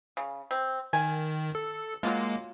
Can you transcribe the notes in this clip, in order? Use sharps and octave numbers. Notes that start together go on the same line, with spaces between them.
C#3
C4
D#3 G#5
A4
F#3 G#3 A#3 F4